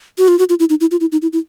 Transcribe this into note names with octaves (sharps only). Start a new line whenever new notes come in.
F#4
F4
F#4
F4
E4
D#4
E4
F4
E4
D#4
E4
E4